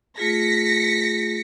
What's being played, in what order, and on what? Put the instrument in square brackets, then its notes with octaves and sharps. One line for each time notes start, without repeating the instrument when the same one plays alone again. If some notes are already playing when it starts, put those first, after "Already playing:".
[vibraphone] A3 F4 G#4 [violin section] A#6 B6 C#7